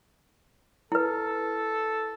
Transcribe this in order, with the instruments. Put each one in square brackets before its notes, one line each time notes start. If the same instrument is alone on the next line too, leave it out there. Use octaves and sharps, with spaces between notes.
[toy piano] E4 B4 [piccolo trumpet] A4